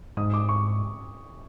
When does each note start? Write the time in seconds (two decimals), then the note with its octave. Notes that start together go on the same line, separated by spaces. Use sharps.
0.17 G#2 D#6
0.34 D6
0.49 C#6